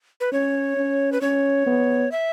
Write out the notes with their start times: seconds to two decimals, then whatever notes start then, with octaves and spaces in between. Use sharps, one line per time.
0.20 B4
0.32 C#4 C#5
0.77 C#4
1.12 B4
1.21 C#4 C#5
1.67 B3
2.12 E5